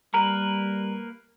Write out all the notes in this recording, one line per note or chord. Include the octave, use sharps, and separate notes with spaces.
G3 A#3 A#4 B4 A#5